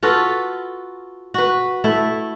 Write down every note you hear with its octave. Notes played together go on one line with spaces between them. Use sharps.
F4 F#4 A4 B4
F#4 B4
A3 E4